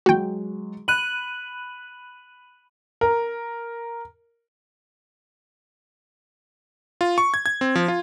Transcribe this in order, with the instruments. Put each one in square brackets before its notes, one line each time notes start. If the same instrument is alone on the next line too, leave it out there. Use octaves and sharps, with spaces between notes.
[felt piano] F#3 G#3 [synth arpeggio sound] F#4 G5
[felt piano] B5 [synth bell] F#6 D#7 F#7
[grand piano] A#4
[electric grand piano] F4
C#6
G#6
G#6
C4
F3
F4